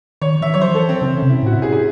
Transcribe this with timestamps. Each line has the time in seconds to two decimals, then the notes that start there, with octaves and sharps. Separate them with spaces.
0.21 D#3 C#5
0.41 E3 E5
0.54 F#3 C#5
0.61 C5
0.69 E3
0.75 A4
0.89 C4
1.02 C#3 C4
1.16 C#4
1.22 C3
1.29 E4
1.43 A2 F#4
1.52 E4
1.62 G#4
1.73 G#4